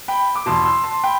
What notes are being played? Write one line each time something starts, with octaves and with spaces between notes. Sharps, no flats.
G5 B5
D6
E2 B2 A5 C6
C6 E6
A5 C6
G5 B5